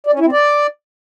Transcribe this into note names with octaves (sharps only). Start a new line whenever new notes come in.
D5
C#4
E4
C4
D5